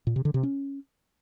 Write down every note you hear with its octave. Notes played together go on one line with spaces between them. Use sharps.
A#2
C3
D3
C3
C#4